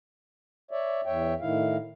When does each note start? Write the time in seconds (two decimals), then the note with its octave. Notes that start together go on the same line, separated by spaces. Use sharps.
0.71 C#5 D5 E5
1.06 E2 C#5 E5 G5
1.41 A2 D#3 E4 F5